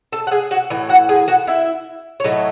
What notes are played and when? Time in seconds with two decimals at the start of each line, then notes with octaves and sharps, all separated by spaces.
0.12 A4 A5
0.27 F#5
0.31 G#4 G#5
0.51 F#4 F#5
0.70 A2 E3
0.89 F#4 F#5
1.09 G#4 G#5
1.28 F#4 F#5
1.47 E4 E5
2.20 C#5
2.24 A2 F#3 A3 D#4 D#5